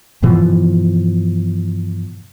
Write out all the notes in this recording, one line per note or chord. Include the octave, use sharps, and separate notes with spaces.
G2 B2 E3 F3